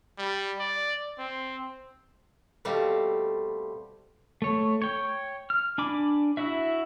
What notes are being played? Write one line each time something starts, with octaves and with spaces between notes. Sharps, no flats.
G3
D5
C4
B2 G3 A3 C4 F5
A3 C#5
C#5 G5
F6
D4 G#5 B5 D6
E4 F#4 E5